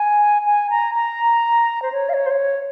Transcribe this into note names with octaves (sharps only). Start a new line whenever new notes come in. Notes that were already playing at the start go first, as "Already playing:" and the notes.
Already playing: G#5
G#5
A#5
A#5
C5
C#5
F5
C#5
C5
C#5